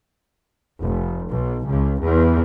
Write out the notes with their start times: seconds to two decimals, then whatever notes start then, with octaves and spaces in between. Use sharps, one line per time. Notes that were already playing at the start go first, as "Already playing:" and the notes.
0.81 F1
1.29 B1
1.65 C#2
2.00 E2